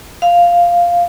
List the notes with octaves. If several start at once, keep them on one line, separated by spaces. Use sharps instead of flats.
F5